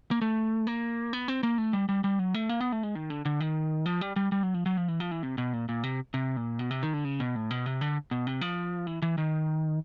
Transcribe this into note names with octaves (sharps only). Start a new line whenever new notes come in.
A#3
A3
A#3
B3
C4
A#3
A3
G3
G3
G3
F#3
A3
A#3
B3
A3
G#3
D#3
D3
D3
D#3
F3
G3
G3
G3
F#3
F3
F#3
F3
E3
F3
E3
C3
B2
A#2
A#2
C3
C3
A#2
B2
C3
D#3
D3
C#3
B2
A2
B2
C3
D3
B2
C3
F3
E3
E3
D#3